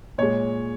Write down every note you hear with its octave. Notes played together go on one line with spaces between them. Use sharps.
A#2 G#3 C#5